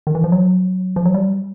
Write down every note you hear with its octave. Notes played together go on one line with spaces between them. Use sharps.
D#3
E3
F3
F#3
F3
F#3
G3